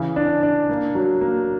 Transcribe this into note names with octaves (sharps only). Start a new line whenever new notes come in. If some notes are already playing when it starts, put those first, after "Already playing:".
Already playing: C#3 E3
D4
D4
A#3
F#3
A#3